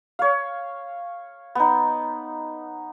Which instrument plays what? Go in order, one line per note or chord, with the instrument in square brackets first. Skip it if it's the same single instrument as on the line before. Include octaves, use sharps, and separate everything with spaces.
[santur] C#5 F5
B3 D#4